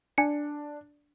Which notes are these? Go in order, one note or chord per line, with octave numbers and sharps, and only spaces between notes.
D4 G#5 C#7